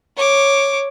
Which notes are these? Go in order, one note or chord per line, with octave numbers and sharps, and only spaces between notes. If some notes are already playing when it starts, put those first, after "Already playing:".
C#5 D6